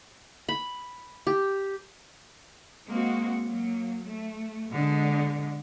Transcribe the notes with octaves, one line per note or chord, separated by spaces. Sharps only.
B5
G4
G#3 A#3 C4 F#4
F#3 A#3
A3
B2 D3 G#3